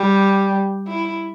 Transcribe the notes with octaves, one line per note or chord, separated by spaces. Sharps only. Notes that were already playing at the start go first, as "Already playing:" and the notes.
Already playing: G3
E4